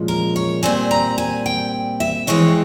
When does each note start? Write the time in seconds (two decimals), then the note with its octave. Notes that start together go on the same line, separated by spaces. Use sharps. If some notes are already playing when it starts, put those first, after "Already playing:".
Already playing: A#2 F3 G#3 C#4
0.08 A#4
0.36 C#5
0.63 A#2 G3 C4 G#5
0.91 A#5
1.18 G#5
1.46 G5
2.00 E5
2.27 F2 E3 G#3 C4 C#5